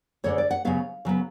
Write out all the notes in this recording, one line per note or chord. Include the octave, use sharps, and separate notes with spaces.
D2 D3 G#3 D4 C#5
D5
F#5
C#3 F#3 B3 F5
C#3 F#3 B3